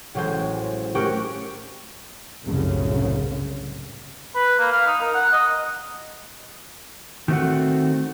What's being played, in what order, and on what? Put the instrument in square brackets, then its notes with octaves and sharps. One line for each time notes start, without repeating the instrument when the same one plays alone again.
[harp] A1 F#3 G#3 C5
A3 C#4 F#4 G4 A#4
[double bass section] G1 C2 F#2 A2 C#3
[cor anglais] B4
A#3
F5
D#4
A#4
F#5
D#5
[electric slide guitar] D#3 G3 A3 C4 F#4 F#5